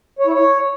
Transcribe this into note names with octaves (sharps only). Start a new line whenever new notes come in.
C#5
E4
C#5